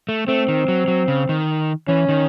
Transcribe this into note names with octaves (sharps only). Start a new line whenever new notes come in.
A3
A3 C4
D#3
F#3
F#3
C#3
D#3
E3 C#4
D#3